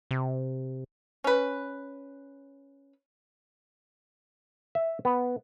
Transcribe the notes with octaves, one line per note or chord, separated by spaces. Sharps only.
C3
C#4 B4
E5
B3